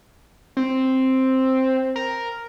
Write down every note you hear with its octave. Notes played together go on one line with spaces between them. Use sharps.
C4
A#4